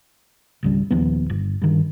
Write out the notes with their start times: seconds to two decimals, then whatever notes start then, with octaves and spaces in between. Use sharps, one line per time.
0.63 G#1 C#2 G3
0.91 D#1 D#2 F3 B3
1.30 G1
1.62 G2 D#3